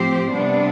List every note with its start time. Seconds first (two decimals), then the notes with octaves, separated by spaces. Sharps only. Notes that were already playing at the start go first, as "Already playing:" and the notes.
Already playing: A2 F3 C4 G4 C5
0.32 C3 G3 B3 D4